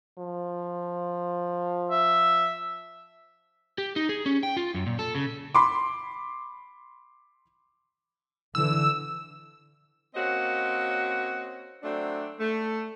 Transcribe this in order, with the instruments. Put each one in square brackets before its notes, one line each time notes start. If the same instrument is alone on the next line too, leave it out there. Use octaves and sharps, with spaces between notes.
[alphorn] F3
[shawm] E5
[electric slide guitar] G4
D#4
G#4
C#4
G5
F4
F#2
A#2
A4
C#3
[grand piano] B5 C6 D6
[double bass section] D3 E3 [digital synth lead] E6
[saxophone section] A#3 C4 C#4 F#4 D#5
F#3 A3 C4 D4
A3